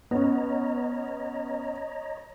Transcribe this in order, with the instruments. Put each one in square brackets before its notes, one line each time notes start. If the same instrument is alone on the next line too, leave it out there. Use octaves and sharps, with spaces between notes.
[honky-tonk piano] B3 C#4 [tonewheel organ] C#5 D#5 A#5